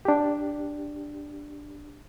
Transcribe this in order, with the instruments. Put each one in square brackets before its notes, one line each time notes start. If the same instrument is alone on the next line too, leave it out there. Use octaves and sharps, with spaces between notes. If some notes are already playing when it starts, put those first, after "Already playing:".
[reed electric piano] D4 G4